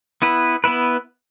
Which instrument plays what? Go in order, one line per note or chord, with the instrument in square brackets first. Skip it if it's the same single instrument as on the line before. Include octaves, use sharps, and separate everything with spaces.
[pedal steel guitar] B3 E4 B4
B3 E4 B4